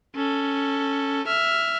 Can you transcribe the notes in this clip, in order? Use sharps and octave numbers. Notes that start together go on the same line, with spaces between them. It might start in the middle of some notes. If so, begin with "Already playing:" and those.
C#4 A4
E5 F6